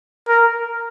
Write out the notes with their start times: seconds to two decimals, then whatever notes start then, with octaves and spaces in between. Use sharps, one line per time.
0.28 A#4